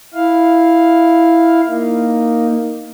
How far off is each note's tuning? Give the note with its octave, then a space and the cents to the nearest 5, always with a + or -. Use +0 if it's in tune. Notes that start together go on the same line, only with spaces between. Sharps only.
E4 +0 F5 +0
A#3 +0 D#4 +0